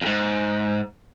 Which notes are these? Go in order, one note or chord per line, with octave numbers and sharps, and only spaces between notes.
F2 G#2